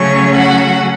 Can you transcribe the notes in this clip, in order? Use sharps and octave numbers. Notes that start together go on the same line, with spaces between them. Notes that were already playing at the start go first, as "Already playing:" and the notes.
Already playing: C#3 F#3 A3 C#4 C#5 C#6
F#4 F#5